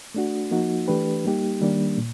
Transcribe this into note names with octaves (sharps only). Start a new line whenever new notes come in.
A3 D4 F#4
F3 A#3 D#4 F#4
E3 A3 D4 G4 B4
G3 A#3 D#4 G4
D#3 G3 A#3 D4
A#2